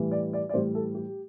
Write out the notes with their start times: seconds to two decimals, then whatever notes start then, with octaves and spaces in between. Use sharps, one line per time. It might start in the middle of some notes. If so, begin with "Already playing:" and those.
Already playing: A2 E3 G3
0.11 D5
0.33 D5
0.49 D5
0.54 A2 E3 G3 C5
0.75 A4
0.95 G4